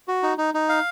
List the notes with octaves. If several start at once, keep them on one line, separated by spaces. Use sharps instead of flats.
F#4
D#4
D#4
D#4
F5